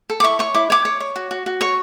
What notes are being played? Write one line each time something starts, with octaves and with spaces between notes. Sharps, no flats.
A4
D6
E4 C#6
C#5 C#6
E4 D6
C#5 D6
C#5
C#5
F#4
F#4
F#4
C#5 C#6